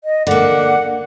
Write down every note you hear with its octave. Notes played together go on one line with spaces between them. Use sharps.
D#5
D3 A#3 F#5